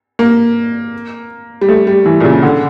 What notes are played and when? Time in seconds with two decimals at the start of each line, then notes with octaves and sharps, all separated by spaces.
0.19 A#3
1.61 G3
1.68 A3
1.87 G3
2.06 E3
2.20 A#2
2.24 C#3
2.43 D3